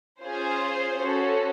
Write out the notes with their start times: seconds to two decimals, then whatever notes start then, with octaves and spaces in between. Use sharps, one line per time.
0.20 C#4 F4 G#4 C5
0.95 C#4 F#4 A4